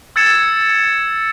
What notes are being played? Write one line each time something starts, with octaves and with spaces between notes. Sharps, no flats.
E6 G#6 A6 C#7 E7